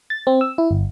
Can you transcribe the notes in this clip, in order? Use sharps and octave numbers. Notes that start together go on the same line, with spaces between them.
A6
C4
E6
E4
G1